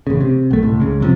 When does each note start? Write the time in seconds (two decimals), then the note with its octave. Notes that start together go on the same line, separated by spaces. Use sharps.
0.07 A1 C#3
0.21 C3
0.51 B1 A3
0.63 C#2 A2
0.80 C#2 C#3
1.00 F2 C3 F3